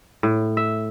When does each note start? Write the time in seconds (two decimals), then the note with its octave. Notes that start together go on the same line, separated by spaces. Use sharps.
0.23 A2
0.57 E5